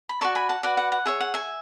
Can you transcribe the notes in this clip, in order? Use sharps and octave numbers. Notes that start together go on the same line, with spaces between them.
B5
F#4 A4 D5 A5 C#6
G#5 B5
F#5 A5
F#4 B4 D5 F#5
F#5
F#5
G#4 C#5 E5
F#5
E5 G#5